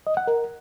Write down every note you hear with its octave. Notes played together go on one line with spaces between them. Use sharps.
D#5
F#5
A#4